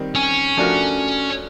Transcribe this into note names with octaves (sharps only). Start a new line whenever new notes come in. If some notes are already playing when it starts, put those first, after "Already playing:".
Already playing: D#3 G3 C4
C#4
F3 A3 D4 F#4 A#4